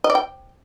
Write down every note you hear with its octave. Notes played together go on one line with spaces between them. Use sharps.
D#5
D5
G5